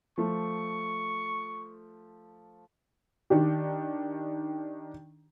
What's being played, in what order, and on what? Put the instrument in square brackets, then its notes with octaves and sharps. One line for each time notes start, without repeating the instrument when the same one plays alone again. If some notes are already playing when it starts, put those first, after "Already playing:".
[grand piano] F3 A3 [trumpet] C#6
[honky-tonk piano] D#3 D4 G4